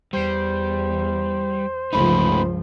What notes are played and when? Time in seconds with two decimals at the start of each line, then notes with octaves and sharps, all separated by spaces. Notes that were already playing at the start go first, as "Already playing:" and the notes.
0.13 E2 G3 C5
1.93 C#2 G2 F3 A3 C#4 D#4 B5